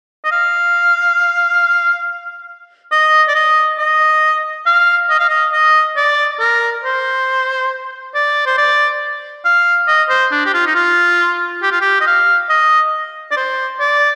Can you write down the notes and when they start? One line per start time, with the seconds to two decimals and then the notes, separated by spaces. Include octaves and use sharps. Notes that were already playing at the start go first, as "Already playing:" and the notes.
0.24 D#5
0.31 F5
2.92 D#5
3.28 D5
3.35 D#5
3.79 D#5
4.66 F5
5.10 D#5
5.20 F5
5.29 D#5
5.53 D#5
5.97 D5
6.39 A#4
6.84 C5
8.14 D5
8.46 C5
8.58 D5
9.45 F5
9.88 D#5
10.10 C5
10.31 D4
10.46 G4
10.54 F4
10.66 D#4
10.75 F4
11.62 G4
11.72 F4
11.81 G4
12.01 D#5
12.06 F5
12.49 D#5
13.31 D5
13.36 C5
13.80 D5